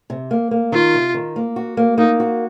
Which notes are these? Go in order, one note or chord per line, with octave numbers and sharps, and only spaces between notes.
C3
A#3
A#3
D#3 F4
C3
D#3
A#3
F#4
A#3
A#3 D#4
F#4